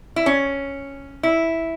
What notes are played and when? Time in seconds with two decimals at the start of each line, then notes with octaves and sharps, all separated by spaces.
0.16 E4
0.26 C#4
1.23 E4